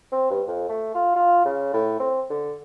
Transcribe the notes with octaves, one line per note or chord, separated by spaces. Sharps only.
C4
G2
F2
A3
F4
F4
C#3
A2
C4
D3